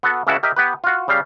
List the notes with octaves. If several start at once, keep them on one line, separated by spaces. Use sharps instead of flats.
B3 F#4 A4
C#2 C#3 E3 E4 F#4 A5
G4 A#4 D#5 E5
B3 G4 B4
F4 F#4
C#3 G3 F5